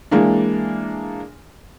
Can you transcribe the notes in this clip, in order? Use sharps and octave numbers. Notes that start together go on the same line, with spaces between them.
E3 G#3 A#3 D4